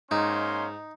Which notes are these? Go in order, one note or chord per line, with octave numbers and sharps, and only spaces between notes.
G#2 A#3 C#4 D#4 C6